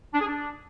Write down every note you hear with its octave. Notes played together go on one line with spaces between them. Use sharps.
D4
G#4
D4